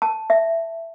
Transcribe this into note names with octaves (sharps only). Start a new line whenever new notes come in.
A5
E5